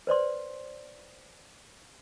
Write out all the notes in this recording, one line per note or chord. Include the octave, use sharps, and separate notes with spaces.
B4 C5 D5 C6